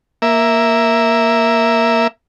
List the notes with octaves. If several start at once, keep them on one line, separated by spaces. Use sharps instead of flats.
A#3 E5